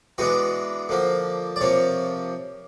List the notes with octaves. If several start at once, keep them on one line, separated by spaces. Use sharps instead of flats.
E3 G#3 B3 D4 F#4
D3 F3 A#3
D5
C3 F3 A#3 C#5